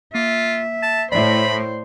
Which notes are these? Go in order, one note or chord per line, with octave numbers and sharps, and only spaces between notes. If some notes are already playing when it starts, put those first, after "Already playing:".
A#3 F4 E5
A5
A2 C5 D5 E5 B5